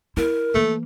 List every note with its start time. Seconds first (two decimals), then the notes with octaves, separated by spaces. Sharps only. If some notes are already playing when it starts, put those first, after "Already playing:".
0.17 E4 A#4
0.54 E3 A3 A#3